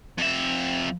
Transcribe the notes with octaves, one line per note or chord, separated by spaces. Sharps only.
F2 E5